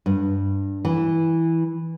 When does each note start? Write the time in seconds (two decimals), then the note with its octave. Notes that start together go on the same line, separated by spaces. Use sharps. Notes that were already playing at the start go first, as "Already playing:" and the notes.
0.06 G2
0.85 E3